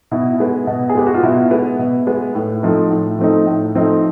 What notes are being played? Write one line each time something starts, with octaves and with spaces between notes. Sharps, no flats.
B2 E4
G#3 B3
B2
G#4
G#3 B3 G4
F#4
F4
B2 E4
G#3 B3
B2
G#3 B3
A2
F3 A3 C4 D#4
A2
F3 A3 C4 D#4
A2
F3 A3 C4 D#4